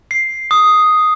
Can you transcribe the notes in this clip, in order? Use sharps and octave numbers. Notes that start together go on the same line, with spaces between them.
C7
D#6